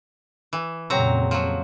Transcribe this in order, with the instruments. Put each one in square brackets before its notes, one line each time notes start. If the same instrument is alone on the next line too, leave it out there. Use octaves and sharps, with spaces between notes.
[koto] E3
[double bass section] F2 A#2 C#3 [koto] F#3 C4 A#5
[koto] F3 F#3